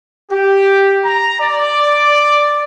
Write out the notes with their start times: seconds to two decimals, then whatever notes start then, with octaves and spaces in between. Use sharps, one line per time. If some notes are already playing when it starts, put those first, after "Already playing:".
0.31 G4
1.04 A#5
1.41 D5